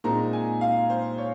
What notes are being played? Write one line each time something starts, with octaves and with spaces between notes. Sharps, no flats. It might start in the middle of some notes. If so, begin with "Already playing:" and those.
A#2 G#3 C4 D#4 A#5
G#5
F5
C5
C#5